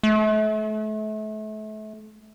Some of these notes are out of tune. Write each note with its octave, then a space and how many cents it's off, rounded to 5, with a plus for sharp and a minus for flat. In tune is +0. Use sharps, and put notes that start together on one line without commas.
A3 -35